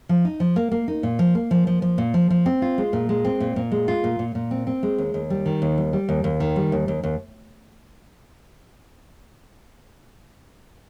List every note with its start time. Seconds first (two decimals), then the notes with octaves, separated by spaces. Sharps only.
0.09 F3
0.25 D#4
0.40 F3
0.56 A#3
0.71 A#3
0.88 D#4
1.03 A#2
1.19 F3
1.35 A#3
1.51 F3
1.67 F3
1.82 F3
1.98 A#2
2.14 F3
2.30 F3
2.46 C4
2.62 F4
2.78 G#3
2.93 A#2
3.09 G#3
3.25 C4
3.40 A#2
3.56 A#2
3.71 G#3
3.88 F4
4.04 A#2
4.19 A#2
4.35 A#2
4.51 C4
4.67 C4
4.83 G#3
4.98 D#2
5.14 D#2
5.30 G3
5.46 D#3
5.62 D#2
5.78 G3
5.93 G3
6.09 D#2
6.24 D#2
6.40 D#3
6.56 G3
6.72 D#2
6.88 D#2
7.03 D#2